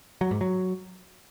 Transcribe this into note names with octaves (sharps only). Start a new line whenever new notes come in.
F#3
G#2
F#3